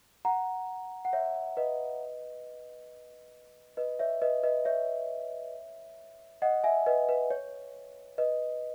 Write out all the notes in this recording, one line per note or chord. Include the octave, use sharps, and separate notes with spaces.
F#5 A#5
F#5
C#5 E5
B4 D#5
B4 D#5
C#5 E5
B4 D#5
B4 D#5
C#5 E5
D#5 F#5
E5 G#5
B4 D#5
B4
C#5
B4 D#5